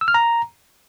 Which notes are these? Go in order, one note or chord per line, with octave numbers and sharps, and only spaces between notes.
E6
F6
A#5